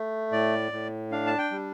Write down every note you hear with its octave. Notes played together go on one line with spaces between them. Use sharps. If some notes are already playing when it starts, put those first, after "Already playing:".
Already playing: A3
A2 D5
A2
D4 F5
A5
G5
G3